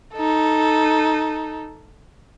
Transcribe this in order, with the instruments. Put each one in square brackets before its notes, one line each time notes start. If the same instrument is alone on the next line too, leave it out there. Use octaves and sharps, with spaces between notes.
[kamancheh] D#4 A4